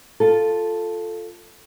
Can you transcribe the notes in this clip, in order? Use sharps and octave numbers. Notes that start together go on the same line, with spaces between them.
F4 A4